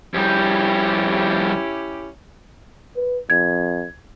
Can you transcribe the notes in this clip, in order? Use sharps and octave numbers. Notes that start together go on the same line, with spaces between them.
F2 G3 C#4 E4 G4
B4
F2 G#6